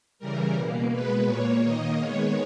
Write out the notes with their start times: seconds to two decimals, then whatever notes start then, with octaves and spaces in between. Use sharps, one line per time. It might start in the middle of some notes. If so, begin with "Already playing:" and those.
0.19 C#3 E3 G3 A#4
0.55 B2 A#3
0.91 B2 G#3 B3 B4
1.27 A#2 A#3 C#5
1.63 D#3 A#3 D#5
1.98 D#3 G#3 B3 C#5